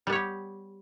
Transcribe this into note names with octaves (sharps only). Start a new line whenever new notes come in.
G3 B3 G4 C#5